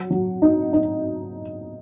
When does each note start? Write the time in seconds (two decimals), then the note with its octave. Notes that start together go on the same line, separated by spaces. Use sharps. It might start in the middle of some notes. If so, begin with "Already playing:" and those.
Already playing: F#3
0.11 F#3
0.42 D#4
0.73 D#4